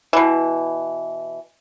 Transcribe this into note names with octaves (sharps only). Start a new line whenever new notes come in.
B2 E3